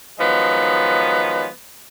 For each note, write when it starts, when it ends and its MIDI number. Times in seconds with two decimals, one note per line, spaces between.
0.19 1.46 51
0.19 1.46 53
0.19 1.46 54
0.19 1.46 56
0.19 1.46 59